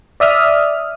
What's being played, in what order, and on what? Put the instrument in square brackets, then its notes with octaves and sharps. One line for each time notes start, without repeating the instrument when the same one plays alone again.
[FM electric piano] D5 E5 D#6 F6